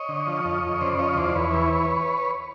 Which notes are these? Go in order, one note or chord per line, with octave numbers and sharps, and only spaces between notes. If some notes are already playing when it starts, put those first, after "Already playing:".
Already playing: C#5 D#5
D3
F3
F2
F2
C#3 C5 D5
F3 C#5 D#5
D#5
E2 C5 D5
E2 B4 C#5
E3